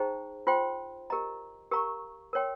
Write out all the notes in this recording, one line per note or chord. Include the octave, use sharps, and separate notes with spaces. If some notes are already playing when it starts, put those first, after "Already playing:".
Already playing: D#4 G#4 C5 G5 A#5
F4 C5 G5 C6
G4 A#4 D#5 A#5
G4 A#4 F5 A#5 C#6
A#4 C#5 G5 C6